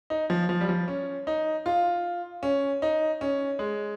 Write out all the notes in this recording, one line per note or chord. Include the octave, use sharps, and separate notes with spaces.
D#4
F3
F3
G3
F3
C#4
D#4
F4
C#4
D#4
C#4
G#3